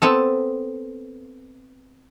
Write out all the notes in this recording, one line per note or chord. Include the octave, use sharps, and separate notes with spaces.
B3 C4 A4